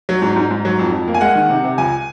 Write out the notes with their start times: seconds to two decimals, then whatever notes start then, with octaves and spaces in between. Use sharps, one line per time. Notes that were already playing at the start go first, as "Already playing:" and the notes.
0.09 F#3
0.22 G#2
0.36 G#2
0.51 G#2
0.65 F#3
0.79 F2
0.92 F2
1.08 A#3
1.14 G#5
1.21 G#3 F#5
1.35 D#3
1.49 C3
1.64 C3
1.78 C#2 G#5